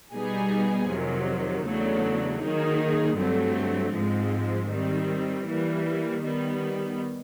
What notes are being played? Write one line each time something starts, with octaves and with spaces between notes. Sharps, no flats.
B2 G3 B3 D#4 G#4
F2 C3 D#3 F#3
E2 C#3 F#3 A3 D4
D#3 F#3 A#3 D#4 G#4
G2 D3 F#3 A3 C4
G#2 F3 G#3 C4
D#3 G3 C4
E3 G3 A#3
D#3 G3 B3